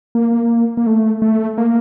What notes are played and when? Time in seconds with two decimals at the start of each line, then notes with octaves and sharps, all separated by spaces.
0.15 A#3
0.77 A#3
0.87 A3
1.22 A3
1.58 A#3